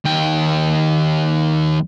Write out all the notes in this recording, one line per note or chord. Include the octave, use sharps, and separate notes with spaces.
D#2 G5